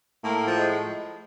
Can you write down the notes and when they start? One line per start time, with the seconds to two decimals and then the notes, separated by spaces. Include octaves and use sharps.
0.23 A2 A#3
0.47 F3
0.55 G#3